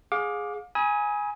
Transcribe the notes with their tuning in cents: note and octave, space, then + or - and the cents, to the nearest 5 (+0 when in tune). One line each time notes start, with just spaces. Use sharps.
G#4 +0 F5 +35 D6 +0
G#5 +0 B5 -35 D#6 +40